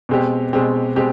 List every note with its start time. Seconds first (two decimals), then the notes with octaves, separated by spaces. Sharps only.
0.09 B2 G#3 C4 G4
0.53 B2 G#3 C4 G4
0.96 B2 G#3 C4 G4